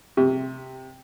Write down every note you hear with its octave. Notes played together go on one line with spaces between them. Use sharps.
C3